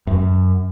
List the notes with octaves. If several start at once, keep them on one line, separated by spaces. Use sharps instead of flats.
F#2